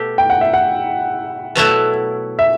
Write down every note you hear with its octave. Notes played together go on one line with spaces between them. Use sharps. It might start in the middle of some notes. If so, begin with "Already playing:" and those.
Already playing: B2 A3 G4
G5
F#5
E5
F#5
B2 F#3 A3 E4
E5